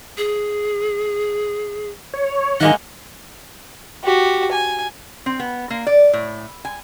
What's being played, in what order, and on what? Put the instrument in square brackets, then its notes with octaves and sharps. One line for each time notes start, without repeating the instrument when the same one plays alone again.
[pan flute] G#4
[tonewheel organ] C#5
[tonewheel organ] D#3 [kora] G#3 A#3 F#5 [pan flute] D#5
[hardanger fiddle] F#4 G4
G#5
[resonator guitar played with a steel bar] C4
B3
A#3
D5
A2
G#5